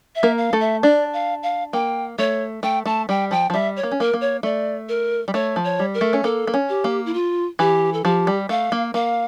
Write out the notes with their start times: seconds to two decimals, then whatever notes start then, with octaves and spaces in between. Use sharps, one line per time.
0.15 E5
0.23 A#3 A#4
0.38 F5
0.53 A3 A4
0.61 E5
0.83 D4 D5
1.13 F5
1.43 F5
1.73 A#3 G5
2.19 A3 C#5
2.63 A3 G5
2.86 A3 A5
3.09 G3 G5
3.31 F3 G5
3.50 F3
3.54 G3 E5
3.76 C#5
3.83 A#3
3.91 C#4
3.99 A#3 A#4
4.14 A#3
4.21 C#5
4.43 A3 D5
4.89 A#4
5.28 G3
5.34 A3 C#5
5.56 F3
5.64 C#5
5.79 G3
5.94 A#4
6.01 A3
6.13 C#4
6.24 A#3 A4
6.47 A#3
6.54 C#4
6.69 G4
6.84 A#3
7.06 E4
7.14 F4
7.59 E3 G4
7.93 A4
8.04 F3 G4
8.27 G3
8.49 A3 F5
8.72 A#3
8.94 A#3 F5